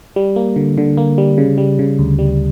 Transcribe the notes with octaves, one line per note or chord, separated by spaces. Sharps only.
G3
A#3
D3
D3
A#3
G3
C#3
G3
C#3
D2
G3